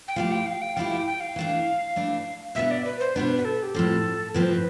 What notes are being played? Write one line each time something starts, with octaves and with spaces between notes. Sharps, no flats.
G5
F3 A3 E4 G4 F5
G5
F5
G5
F3 A3 E4 G4 F5
G5
G5
F5
E3 A3 D4
E3 A3 D4
B2 B3 D4 E5
D5
B4
C5
B2 B3 D4 B4
B4
A4
G4
A2 F3 C4 A4
A2 F3 C4 B4
C5
B4